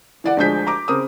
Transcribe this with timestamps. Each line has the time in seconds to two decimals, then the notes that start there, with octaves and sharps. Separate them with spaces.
0.24 E3 D5 F#5
0.37 D2 F3 G#3 D4 G6 B6
0.67 A#5 D6
0.88 C#3 C4 A#4 D#6